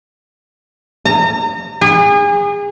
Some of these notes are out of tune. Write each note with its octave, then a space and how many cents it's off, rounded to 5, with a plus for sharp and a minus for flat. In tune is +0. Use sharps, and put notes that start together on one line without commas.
A#5 -35
G#4 -35